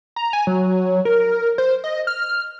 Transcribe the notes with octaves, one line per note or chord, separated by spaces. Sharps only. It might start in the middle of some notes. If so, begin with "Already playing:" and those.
A#5
G#5
F#3
A#4
C5
D#5
F6